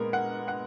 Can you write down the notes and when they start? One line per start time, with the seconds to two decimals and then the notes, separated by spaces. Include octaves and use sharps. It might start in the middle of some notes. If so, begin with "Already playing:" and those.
Already playing: A#2 G#3 B3 A#4
0.13 F#5
0.48 F#5